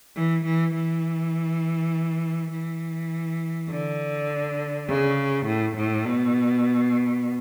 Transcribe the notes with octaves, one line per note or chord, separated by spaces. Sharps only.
E3
E3
E3
E3
D3
C#3
A2
A2
B2